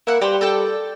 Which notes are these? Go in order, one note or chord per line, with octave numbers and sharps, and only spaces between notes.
A#3 E4 F#5
G3 G4 B4 C5
A4 D5 G5